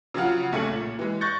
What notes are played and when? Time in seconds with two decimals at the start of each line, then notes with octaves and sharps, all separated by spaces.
0.14 C#3 F3 F#3 F4 F#5 F6
0.52 B1 A3 C#4 G#4 C#7 F#7
0.72 A#2
0.99 E3 G#3
1.21 C#6 F#6 G6 A6 A#6 C#7